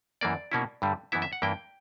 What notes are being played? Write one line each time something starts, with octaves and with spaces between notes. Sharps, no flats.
F#2 E3 A#3 D5
B2 A#3 C#4 E4
G2 D3 G3
F#2 E3 B3 E4 E5
E5
F#5
G2 E3 A#3 E4 G5